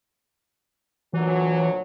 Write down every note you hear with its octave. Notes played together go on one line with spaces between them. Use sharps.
D2 A#2 E3 F#3